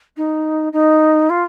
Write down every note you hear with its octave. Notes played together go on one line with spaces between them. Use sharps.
D#4
D#4
F4